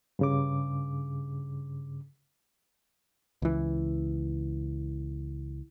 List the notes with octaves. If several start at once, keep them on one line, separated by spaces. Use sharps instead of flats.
G2 C#3 D6
C#2 E3